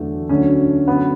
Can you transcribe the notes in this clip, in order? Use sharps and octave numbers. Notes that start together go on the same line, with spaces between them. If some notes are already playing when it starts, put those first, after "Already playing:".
Already playing: E2 D3 F#3 A3
D2 D3 F#3 C#4
F#2 D3 F#3 B3